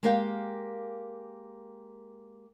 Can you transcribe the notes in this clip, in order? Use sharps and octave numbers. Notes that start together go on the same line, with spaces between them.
G#3 A#3 G4 A#4 F5 G5